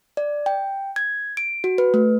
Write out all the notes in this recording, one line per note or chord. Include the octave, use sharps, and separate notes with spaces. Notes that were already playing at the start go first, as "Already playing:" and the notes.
D5
G5
G#6
D7
F#4
B4
A3